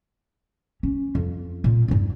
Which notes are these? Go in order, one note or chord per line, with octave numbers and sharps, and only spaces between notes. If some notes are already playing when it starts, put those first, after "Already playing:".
C#4
F2
A#2
E2 G2